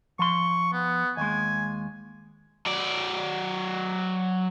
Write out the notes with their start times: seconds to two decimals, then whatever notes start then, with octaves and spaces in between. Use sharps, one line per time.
0.19 F3 C6 C#6
0.73 B3
1.17 D#2 G#3 G#5
2.66 F#3 D5